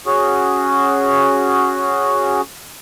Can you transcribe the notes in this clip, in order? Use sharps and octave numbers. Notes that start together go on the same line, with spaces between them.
C#4 F#4 G#4